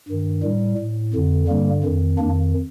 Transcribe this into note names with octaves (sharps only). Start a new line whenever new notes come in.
G2 D#3
A2 G3
A2
F2 D3
G2 D3 G3 A#3
F2 D#3
F2 D#3 A#3 D4